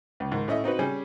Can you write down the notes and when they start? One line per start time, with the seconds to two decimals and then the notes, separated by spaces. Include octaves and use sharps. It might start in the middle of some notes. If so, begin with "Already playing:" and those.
0.20 C#2
0.32 G#2 D#3
0.48 A2 C#4 D#5 E5
0.64 C4 D#4 F#4 B4
0.79 G3 C#4 G4 G#4